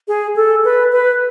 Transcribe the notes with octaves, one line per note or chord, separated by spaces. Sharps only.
G#4
A4
B4
B4